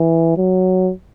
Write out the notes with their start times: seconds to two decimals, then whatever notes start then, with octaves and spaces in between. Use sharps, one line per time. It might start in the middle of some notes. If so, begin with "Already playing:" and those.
Already playing: E3
0.37 F#3